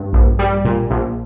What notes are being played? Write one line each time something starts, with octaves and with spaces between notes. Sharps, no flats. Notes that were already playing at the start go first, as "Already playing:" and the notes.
Already playing: G2
A#1
G3
A#2
A#1